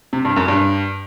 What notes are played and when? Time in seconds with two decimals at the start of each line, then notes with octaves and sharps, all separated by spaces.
0.13 C3
0.25 G2
0.36 F#2
0.48 G2